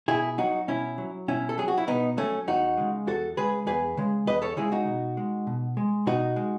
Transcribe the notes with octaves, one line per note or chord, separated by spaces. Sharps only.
B2 E4 G#4
F#3 D#4 F#4
B2 C#4 E4
F#3
B2 C#4 E4
A4
F#3 G#4
F#4
E4
B2 B3 D#4
F#3 A3 C#4
E2 D#4 F#4
C#3 G#3
E2 F#4 A4
C#3 G#3 G#4 B4
E2 G#4 B4
C#3 G#3
E2 B4 D#5
A4 C#5
C#3 G#3 E4 G#4
D#4 F#4
B2
G#3
B2
G#3
B2 D#4 F#4
G#3